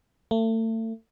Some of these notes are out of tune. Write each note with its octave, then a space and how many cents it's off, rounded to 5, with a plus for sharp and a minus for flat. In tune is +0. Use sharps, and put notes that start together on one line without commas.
A3 +35